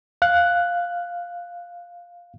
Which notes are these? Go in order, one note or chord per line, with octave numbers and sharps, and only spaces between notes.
F5 F#6